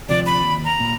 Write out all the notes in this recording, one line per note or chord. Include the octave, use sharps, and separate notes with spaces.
D2 C3 F3 D5
B5
D#2
A#5
A#2